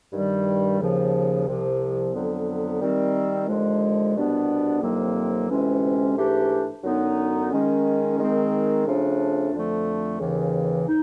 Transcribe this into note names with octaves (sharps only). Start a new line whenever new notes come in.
G2 D#3 G3
D#2 C#3 F3
C2 C3 F3
F2 D3 F#3 B3
D#3 G3 C4
D#2 D3 F3 G#3
C2 B2 G3 B3 D4
F2 C3 D#3 F#3 A#3
D2 C3 E3 G#3 C#4
G#2 E3 A3 D4 G4
F#2 D3 F#3 B3 D#4
D#3 G#3 C#4
D#3 G#3 C4
C#3 F3 A3 D4
F2 D3 F3 A3
D#2 C#3 E3
D#4